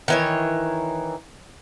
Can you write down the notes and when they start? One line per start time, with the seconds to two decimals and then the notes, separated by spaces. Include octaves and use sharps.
0.08 D#3 E3 C#5